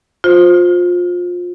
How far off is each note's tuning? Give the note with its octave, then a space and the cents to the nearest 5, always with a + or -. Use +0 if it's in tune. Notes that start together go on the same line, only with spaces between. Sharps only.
F4 +25 C5 +0